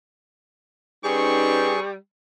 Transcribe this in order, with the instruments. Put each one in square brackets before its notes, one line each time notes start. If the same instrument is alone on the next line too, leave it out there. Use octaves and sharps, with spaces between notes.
[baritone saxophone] G3 [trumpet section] C4 C#6 [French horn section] C#4 D#4 B4 [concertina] G#4